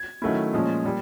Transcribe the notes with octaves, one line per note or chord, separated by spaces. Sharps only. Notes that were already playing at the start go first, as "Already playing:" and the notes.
Already playing: G#6
D#3 F#3 A3 C#4 E4
A#2 F3 G#3 C#4
A#2 G3